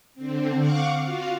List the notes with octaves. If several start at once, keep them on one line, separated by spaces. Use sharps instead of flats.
D3 C4
F5 F#5 C#6 D6
F4 F#4 F5